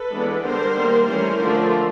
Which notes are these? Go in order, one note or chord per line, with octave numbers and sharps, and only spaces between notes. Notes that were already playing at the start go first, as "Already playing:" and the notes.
Already playing: A4 B4
E3 G#3 B3 D4
D3 G3 B3 D4 A#4 C5
D#3 G3 A#3
E3 A3 C#4 A#4 C5
D3 F3 A3 D4